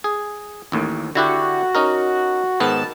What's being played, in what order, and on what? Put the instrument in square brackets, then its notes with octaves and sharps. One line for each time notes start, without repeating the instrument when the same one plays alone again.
[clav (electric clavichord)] G#4
A1 D#2 A2
[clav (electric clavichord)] D3 E4 G4 [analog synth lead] F#4
[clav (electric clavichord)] C#4 D#4 A#4
[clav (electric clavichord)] G#2 D#3 B3 [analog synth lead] A5